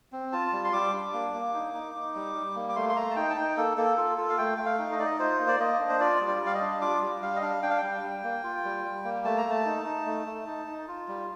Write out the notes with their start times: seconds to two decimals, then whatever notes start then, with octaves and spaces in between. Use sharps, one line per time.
0.12 C4
0.32 F4 A5
0.52 G3
0.64 C6
0.73 G3 D6
0.93 D4
1.13 A#3
1.34 A#3
1.54 D#4
1.74 D#4
1.95 D#4
2.15 G3
2.35 G3
2.56 A#3
2.69 D6
2.76 A3 C6
2.89 C6
2.96 A3 A#5
3.11 A5
3.16 D#4 G5
3.30 A5
3.37 D#4 G5
3.57 A#3 A4
3.77 A#3 A4
3.97 F4 A4
4.18 F4 A4
4.29 F5
4.38 A3 G5
4.57 A3 G5
4.65 F5
4.79 D#4
4.92 D#5
4.99 D#4 D5
5.06 D#5
5.19 F4 C5
5.39 A#3
5.48 D5
5.60 A#3 D#5
5.80 D4
5.89 C5
6.00 F4 D5
6.21 G3
6.27 D5
6.41 G3
6.46 F5
6.54 D#5
6.61 D4
6.81 F4 D6
7.02 G3
7.22 G3 F5
7.36 D#5
7.42 D4 F5
7.63 D4 G5
7.70 F5
7.78 G3 G5
8.03 G3
8.23 A#3
8.44 F4
8.64 G3
8.84 G3
9.04 A#3
9.25 A3 A5
9.38 A#5
9.45 A3
9.51 A5
9.66 D#4
9.86 D#4
10.06 A3
10.26 A3
10.47 D#4
10.67 D#4
10.88 F4
11.08 G3